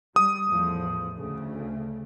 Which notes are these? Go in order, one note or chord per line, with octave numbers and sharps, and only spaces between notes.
G3 D#6
E2 A2 F3
D2 C#3 A3